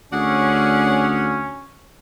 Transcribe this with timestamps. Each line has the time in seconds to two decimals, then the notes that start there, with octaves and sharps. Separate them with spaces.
0.12 D2 C#4 G#4 D5 F#5